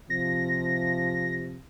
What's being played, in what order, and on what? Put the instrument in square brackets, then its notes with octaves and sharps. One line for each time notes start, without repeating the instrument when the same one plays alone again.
[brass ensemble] C3 F3 [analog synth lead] A#6